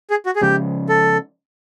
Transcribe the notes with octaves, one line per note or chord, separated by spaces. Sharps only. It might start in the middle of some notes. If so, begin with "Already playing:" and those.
G#4
F#4
G#4
C#3 F3 G#3 C#4 G4
A4